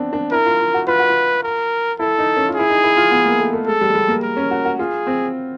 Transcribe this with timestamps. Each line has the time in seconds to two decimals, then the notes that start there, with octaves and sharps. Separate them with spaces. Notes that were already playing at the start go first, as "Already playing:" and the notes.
Already playing: B3 C4 D4
0.13 D4
0.32 E4 A#4
0.46 F4
0.60 F4
0.74 F#4
0.87 F4 B4
0.99 F#4
1.09 F4
1.43 A#4
1.99 E4 A4
2.18 D#4
2.37 C#4
2.48 F4
2.55 E4 G#4
2.70 D#4
2.84 E4
2.97 F4
3.11 B3
3.25 A#3
3.40 A3
3.53 A3
3.67 G#3 A4
3.81 G3
3.90 G#3
3.95 G3
4.08 A#3
4.23 A#4
4.37 C#4
4.51 F#4
4.65 F#4
4.79 F4 G#4
5.07 C4